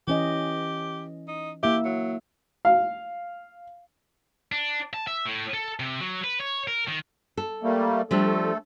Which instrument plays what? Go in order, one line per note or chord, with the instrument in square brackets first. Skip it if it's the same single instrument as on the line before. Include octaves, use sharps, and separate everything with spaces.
[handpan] E3 C#4 D#5 [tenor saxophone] G4
[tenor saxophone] D#4
[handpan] A#3 E4 E5 [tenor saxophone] G4
[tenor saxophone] F#3
[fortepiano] F5
[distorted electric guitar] D4
A5
E5
A2
A4
C3
F#3
B4
C#5
A#4
D#3
[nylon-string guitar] A4
[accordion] G3 A3 A#3
[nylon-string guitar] F3 G3 D4 [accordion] A3 A4